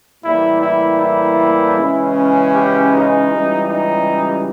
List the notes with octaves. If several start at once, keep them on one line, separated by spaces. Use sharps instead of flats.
A2 E3 G3 A#3 E4
E4
E4
C#3 E3 G#3 C#4
G4
D#4
C#2 C#3 E3 G3
D#4